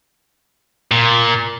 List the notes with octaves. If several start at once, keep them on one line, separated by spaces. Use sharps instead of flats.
A#2